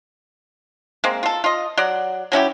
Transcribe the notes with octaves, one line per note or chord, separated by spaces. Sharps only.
G#3 A#3 C4
F4 A4
F4 D#5
F#3 D5 F#5
F#3 C#4 E4 G4